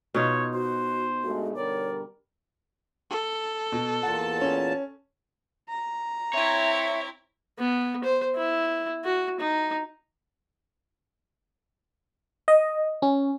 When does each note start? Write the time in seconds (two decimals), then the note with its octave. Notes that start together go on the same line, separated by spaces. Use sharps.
0.15 B2 D#4 F4 C#5
0.54 F#4 C5
1.23 G2 G#3 A3 F#4
1.55 D3 G3 A#4 C#5 D5
3.11 A4
3.72 B2
4.03 E2 A#2 F#5 A5
4.41 C#4
5.69 A#5
6.33 C4 E4 C#5 E5
7.59 B3
8.04 C5
8.36 E4
9.05 F#4
9.40 D#4
12.48 D#5
13.02 C#4